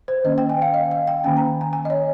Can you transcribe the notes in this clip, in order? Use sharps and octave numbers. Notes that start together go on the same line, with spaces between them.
C5
D#3 A#3 C#4 D#5
G5
G#5
F5
D#5
F5
G5
D#3 A#3 C#4 G#5
A#5
G#5
G#5
D#5
C#5